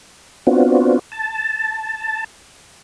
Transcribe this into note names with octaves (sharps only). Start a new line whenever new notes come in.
B3 C4 D4 F4 F#4
A5